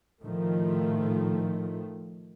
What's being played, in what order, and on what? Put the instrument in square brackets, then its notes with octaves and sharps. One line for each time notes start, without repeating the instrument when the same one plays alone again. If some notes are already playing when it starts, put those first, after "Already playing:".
[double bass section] A2 D#3 F3 A3